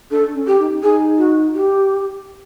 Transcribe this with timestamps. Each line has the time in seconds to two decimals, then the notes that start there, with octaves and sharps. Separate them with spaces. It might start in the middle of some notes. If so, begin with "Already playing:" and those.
0.11 D4 A4
0.35 C#4
0.47 G4
0.59 D#4
0.82 D#4 G#4
1.18 F#4
1.54 G4